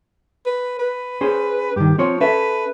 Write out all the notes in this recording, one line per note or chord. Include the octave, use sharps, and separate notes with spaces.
B4
B4
C#4 G#4 C5
G2 D#3 G4
F3 C4 C#5
C#4 A4 B4 E5